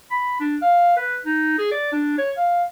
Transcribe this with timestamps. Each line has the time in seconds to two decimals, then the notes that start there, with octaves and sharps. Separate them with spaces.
0.11 B5
0.40 D4
0.62 F5
0.97 B4
1.25 D#4
1.58 G#4
1.72 D5
1.92 D4
2.18 C#5
2.37 F5